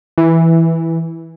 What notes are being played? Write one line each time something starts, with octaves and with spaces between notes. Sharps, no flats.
E3